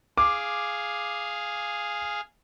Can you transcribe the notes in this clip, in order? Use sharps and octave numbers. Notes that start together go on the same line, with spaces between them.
G#4 F5 D6